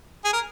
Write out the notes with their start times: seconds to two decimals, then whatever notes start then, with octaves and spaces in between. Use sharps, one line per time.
0.25 G#4
0.33 A#4